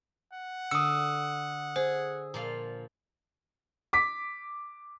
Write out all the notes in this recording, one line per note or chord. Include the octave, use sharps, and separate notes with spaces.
F#5
D3 D#6 E6 C#7
G#4 C5
A#2 F3 F5
D6 B6